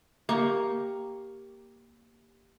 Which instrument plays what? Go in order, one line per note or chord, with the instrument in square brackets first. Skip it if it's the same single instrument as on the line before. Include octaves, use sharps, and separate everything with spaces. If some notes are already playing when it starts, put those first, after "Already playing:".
[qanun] A#3 G4 C#6